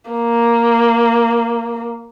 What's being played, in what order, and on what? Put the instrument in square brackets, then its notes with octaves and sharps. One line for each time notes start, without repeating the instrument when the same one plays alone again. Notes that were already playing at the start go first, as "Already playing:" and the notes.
[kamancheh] A#3